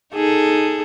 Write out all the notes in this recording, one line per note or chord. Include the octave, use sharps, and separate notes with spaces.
D#4 G#4 A4